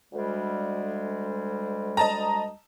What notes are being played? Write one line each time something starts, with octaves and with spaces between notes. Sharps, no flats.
D2 G3 G#3
D#5 A5 A#5